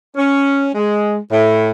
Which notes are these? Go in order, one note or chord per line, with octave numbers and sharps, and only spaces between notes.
C#4
G#3
A2